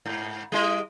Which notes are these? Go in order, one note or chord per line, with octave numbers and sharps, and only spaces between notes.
G#2
G3 E4 D#5